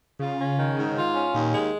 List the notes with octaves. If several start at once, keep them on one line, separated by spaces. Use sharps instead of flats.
C#3 F4
C#4
D#3
G#2
F4
C#4
D#2 A#2
G#3